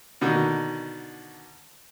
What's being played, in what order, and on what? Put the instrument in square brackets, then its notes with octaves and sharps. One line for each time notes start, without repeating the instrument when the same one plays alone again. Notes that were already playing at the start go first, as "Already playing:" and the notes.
[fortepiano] B2 D3 D#3